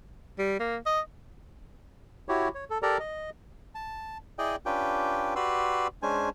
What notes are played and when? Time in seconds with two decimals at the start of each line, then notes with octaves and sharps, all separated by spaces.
0.38 G3
0.60 A#3
0.86 D#5
2.29 E4 F#4 G4 C#5
2.55 C#5
2.70 A4
2.82 G4 A4 A#4 D5 A#5
2.99 D#5
3.75 A5
4.39 E4 G#4 D5 D#5 G5
4.66 C#4 D4 F4 G4 B4 G5
5.36 F#4 G4 B4 D5 C6 E6
6.03 G#3 C#4 D4 C5 G#5